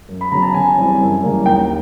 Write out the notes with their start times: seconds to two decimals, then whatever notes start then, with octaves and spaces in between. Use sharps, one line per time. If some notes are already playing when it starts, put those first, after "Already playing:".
0.09 F#2
0.21 B5
0.31 C#3 F#3 B3 A#5
0.43 A5
0.54 C#3 G#5
0.78 E3 G3 C4
1.01 F#2
1.23 C#3 E3 G3 A#3
1.46 D#2 G5